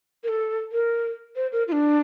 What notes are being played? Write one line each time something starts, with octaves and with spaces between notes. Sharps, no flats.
A#4
A4
A#4
C5
A#4
F4
D4